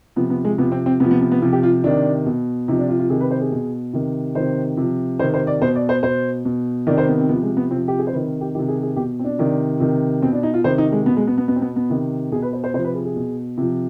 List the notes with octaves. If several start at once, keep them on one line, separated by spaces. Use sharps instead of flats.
C3 F3 B3
B3
G#3
C3 F3 B3
C4
C4
C3 F3 B3
B3
B3
B3
C3 F3 F4
G4
F4
C3 D#3 D4
B2
C3 F3 D#4
D4
F4
F4
C3 D#3 G#4
B4
C5
G#4
B2
C3 D#3
C3 D#3 C5
C3 F3
C3 D#3 C5
C5
D5
B2 C5
D5
C5
B2 C5
B2
C3 D#3 D5
C5
B3
C4
C3 F3 B3
G#3
B3
C3 F3 C4
G4
G#4
C5
C3 D#3 B4
G4
C3 D#3 G4
G#4
G#4
B2 G4
C4
D4
C3 D#3
C3 D#3
B2 C4
D4
D#4
F4
C3 D#3 C5
D#4
G#3
B2 B3
G#3
B3
B3
B2 B3
C4
B3
B3
C3 D#3
B2 G#4
B4
C5
C5
C3 F3 C5
B4
G#4
G#4
B2
C3 F3